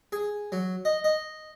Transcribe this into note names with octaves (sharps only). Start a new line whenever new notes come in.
G#4
F#3
D#5
D#5